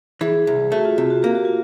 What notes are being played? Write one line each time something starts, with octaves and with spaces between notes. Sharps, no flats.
E3 G#4
C2
A3 F#4
F4
C3
F#4
A#3 G4
F#4
F4